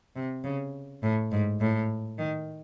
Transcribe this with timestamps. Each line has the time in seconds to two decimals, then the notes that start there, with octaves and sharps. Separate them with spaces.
0.15 C3
0.44 C#3
1.03 A2
1.31 G#2
1.60 A2
2.18 D#3